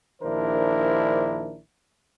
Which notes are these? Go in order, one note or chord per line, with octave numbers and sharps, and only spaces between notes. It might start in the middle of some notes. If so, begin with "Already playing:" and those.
A#1 D#3 D4 E4 A#4 C5